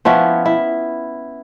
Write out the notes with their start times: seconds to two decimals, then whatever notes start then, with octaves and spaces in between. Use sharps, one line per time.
0.05 F3 B3 C#4 E4
0.46 E4